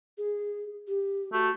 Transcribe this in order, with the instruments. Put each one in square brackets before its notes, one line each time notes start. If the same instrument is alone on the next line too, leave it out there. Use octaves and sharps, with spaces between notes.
[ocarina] G#4
G4
[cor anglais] A3 [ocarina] F#4